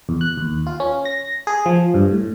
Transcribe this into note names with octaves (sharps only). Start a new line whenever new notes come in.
E2
F#6
D#2
F4
C#4
A#6
G#4
F3
G2
A2